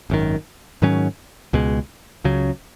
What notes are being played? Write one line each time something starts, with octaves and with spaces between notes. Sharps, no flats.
G#1 F#2 D#3
G#2 D#3 F#3 C#4
C#2 B2 G#3
C#2 C#3 F#3